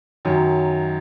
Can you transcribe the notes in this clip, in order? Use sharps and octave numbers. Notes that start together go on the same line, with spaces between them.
F#2 D#3 F#3